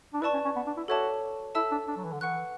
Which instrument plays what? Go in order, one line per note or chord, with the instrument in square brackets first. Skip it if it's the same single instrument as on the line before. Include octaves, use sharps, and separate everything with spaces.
[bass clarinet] D4
[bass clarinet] E4 [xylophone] B4 D5 A5 C#6
[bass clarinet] C#4
C#4
B3
D4
E4
[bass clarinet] F#4 [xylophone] A4 C#5 E5 A5 D6
[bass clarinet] E4 [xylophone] A4 E5 A5 E6
[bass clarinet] D4
D4
F#3
E3
D3
[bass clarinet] E3 [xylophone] B4 F#5 C#6 F#6